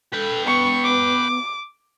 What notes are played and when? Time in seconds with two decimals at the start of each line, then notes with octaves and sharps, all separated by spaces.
0.13 A4 B4 G5
0.46 B3 C#6
0.84 D6